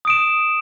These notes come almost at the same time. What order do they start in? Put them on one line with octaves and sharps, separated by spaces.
D#6 D7 E7